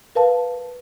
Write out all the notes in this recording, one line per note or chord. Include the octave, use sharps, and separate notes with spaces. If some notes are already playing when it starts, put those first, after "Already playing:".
A#4 B4 F5 A5